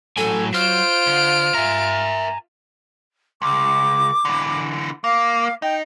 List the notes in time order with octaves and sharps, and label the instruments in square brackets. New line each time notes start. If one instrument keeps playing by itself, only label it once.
[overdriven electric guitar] A2 G#5 [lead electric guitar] F#3 [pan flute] A4
[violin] F4 D7 [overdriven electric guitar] C5 [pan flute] F6
[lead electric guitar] D3
[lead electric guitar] A#4 E5 [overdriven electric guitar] G#5 A#5
[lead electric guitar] C#2 [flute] D6
[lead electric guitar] D3 E3
[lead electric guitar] A#3 [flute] F5
[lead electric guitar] D#4 [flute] G5